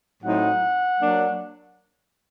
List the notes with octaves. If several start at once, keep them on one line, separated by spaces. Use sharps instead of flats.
A2 F#3 C4 D#4 F#5
F#3 A#3 D4